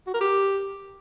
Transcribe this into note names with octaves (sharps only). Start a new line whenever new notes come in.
F#4
A#4
G4